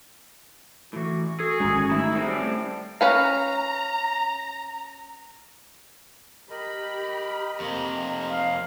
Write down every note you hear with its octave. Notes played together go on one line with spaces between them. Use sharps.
A2 E3 F#4
F#4 G#4 A4
G#1 D3 G#3 C#4 A#5
G2 D#3 A3 E4
A2 D#3 C4 G#4
G3 C4 C#4 D5
C#4 B4 F5 A#5
G4 A#4 D#5 B5
F2 C3 A#3 D#5
F5